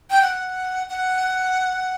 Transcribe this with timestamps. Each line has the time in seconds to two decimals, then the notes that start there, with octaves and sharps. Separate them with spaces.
0.10 G5
0.22 F#5
0.89 F#5